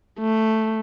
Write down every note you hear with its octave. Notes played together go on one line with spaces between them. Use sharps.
A3